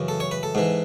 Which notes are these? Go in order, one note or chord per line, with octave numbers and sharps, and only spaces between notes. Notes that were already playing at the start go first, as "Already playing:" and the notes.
Already playing: F#2 C#3 E3
A4
C#5
B4
A4
G#2 E3